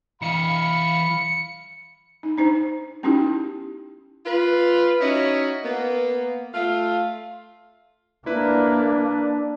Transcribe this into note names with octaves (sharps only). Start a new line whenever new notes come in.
E3 D#5 F5 B5 C#7
D#4
D4 D#4 C5
B3 C#4 D#4 E4 F#4 G4
F4 B4
C#4 D#4 E4 F#4 C#5 D#5
A#3 B3
A3 F4 F5
A#3 D4 E4 B4